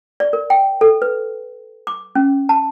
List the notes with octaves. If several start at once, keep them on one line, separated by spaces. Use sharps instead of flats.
D5
A#4
G5
A4
B4
D6
C#4
A5